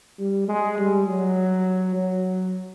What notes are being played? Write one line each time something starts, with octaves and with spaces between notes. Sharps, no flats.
G3
G#3
G3
F#3
F#3